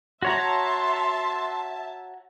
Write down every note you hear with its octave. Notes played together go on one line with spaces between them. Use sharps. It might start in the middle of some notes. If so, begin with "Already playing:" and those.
F#4 C#5 E5 A5 A#5 C6